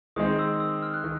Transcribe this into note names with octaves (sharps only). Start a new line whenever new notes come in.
D#3 G#3 C4 D#4 D#6
E6
E6
F6
F#6
D#3